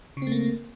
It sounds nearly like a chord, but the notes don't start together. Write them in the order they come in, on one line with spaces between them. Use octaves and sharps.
C#3 C4 A3 A#3